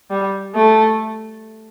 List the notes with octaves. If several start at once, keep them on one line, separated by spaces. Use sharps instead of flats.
G3
A3